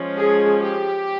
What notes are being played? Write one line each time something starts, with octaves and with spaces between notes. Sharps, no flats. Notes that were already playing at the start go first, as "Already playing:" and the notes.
Already playing: F3 G#3 C#4
G#4
G4